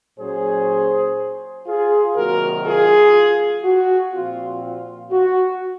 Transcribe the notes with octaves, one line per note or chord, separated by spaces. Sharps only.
A#2 F#3 C#4 G#4 C5
F4 G#4
C3 D#3 F#3 A#3 F#4 A#4
F4 G#4
F#4
A#2 F3 C4 F4
F4
F#4